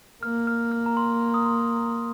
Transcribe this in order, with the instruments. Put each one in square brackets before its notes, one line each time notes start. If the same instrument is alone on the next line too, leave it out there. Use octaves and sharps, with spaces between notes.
[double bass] A#3 [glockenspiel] F6
[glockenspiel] F6
F6
A#5
C6
D#6
C6
D#6